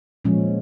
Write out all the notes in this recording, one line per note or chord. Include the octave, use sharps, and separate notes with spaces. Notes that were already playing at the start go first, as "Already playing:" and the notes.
A#2 F3 G#3 C#4